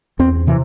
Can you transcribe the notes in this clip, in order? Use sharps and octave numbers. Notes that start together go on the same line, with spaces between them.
E2 C4
C3 E3